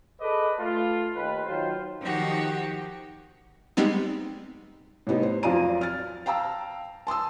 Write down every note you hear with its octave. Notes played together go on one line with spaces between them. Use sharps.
G#4 A4 B4 D5 D#5
A3 F4
D#2 B4
D#3 F#3 F4 C5
D#3 F3 D#4 F#4 G4
G3 G#3 B3 C4 D#4
A2 C3 B3 D#4
C5
F2 F#3 F4 D5 A#5 D#7
F6 A6
F5 G5 A5 A#5 E6
A5 C6 D#6 E6